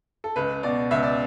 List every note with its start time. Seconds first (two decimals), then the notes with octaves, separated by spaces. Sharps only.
0.24 A4
0.36 C#2 B4
0.63 B2 D5
0.91 C#2 E5
1.03 D5